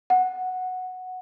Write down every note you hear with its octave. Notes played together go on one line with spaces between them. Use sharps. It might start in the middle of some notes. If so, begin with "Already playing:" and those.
F#5